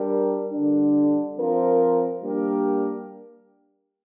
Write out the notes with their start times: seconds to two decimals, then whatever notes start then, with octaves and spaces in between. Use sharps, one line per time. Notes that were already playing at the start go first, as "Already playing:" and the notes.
Already playing: G3 D4 A#4
0.53 D3 G3 D4
1.37 F3 C4 F4 A#4
2.22 G3 A#3 D4 G4 A#4